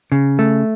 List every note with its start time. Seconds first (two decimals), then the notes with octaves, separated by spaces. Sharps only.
0.12 C#3
0.39 A3